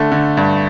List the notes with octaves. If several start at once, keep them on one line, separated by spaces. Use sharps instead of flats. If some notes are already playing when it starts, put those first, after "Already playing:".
Already playing: D3 A3
D3
G2